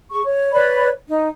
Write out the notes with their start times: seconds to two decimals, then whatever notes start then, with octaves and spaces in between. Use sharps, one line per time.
0.11 G#4 C#6
0.24 C#5
0.52 B4 C#5 D5 B5
1.07 D#4